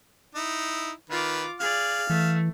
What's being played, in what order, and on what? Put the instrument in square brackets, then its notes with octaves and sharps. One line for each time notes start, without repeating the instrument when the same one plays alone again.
[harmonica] D#4 E4
[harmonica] D#3 B4 [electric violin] F4 D6
[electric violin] G#4 D5 [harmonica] F5
[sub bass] E3 [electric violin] A3